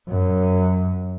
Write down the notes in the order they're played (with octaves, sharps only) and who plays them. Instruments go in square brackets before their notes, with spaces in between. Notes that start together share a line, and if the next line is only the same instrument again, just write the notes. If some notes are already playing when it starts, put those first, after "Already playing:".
[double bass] F#2